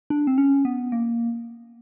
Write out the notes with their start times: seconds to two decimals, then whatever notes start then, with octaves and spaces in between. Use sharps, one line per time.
0.10 D4
0.27 C4
0.38 C#4
0.65 B3
0.92 A#3